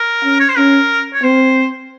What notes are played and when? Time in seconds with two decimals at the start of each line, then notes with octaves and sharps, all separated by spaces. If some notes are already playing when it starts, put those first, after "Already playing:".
Already playing: A#4
0.24 C#4
0.40 C#5
0.49 C5
0.57 C#4 A#4
1.13 C#5
1.23 C4 C5